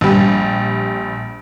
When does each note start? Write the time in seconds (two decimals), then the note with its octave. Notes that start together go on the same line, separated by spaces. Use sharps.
0.01 A#1 G3